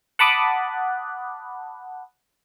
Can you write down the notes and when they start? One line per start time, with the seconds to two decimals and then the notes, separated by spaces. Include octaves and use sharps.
0.19 F#5 A5 B5 D6 D#6 F#6